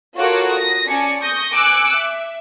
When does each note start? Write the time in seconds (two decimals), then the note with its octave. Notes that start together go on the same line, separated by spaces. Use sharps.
0.18 F4 F#4 A4 A#4 C#5 D6
0.51 D#6 A#6
0.87 C#4 D5 G#5 A5 C#7
1.21 C#6 D#6 G6 A#6
1.54 G#5 D6 E6 F#6 C#7 D7
1.98 E5